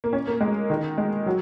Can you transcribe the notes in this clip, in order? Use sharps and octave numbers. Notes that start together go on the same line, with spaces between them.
A#3
C#4
A#3
G#3
D#3
G#3
F#3